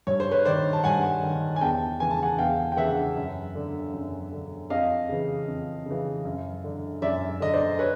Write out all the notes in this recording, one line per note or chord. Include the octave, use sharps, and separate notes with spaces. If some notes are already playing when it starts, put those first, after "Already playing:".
G2 C#5
C5
B4 C#5
D#3 C5 D5
A5
G2 F#5 G#5
D#3
G#5
E2 G5 A5
C#3 E3 G#5
A5
F#5 G#5
E2 F5 G5
G5
C#3 E3 E5 F#5
F#2
D3
F#2
D3
F2 D#5 F5
C#3 E3
F2
C#3
E3
F#2
D3
F#2 D5 E5
D3 D#5
C5 D5
B4 C#5